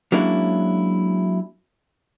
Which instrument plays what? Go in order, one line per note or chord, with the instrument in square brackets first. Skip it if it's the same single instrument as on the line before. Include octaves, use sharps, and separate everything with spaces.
[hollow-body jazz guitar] F#3 G#3 A#3 C#4 D4 E4